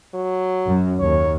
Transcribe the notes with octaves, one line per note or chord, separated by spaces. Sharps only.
F#3
F#2
D#2 C#5